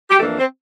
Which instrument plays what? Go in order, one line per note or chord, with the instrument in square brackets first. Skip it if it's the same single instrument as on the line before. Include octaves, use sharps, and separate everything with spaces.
[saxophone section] G4
F2 E3 A3 A#3 D4 A4
C4 C5